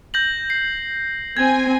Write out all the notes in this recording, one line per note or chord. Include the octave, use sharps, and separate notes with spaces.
G6 A#6 F#7
C7
C4 G#5 G#6